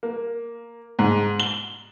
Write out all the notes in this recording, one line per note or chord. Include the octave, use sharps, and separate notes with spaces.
A#3
G#2
G7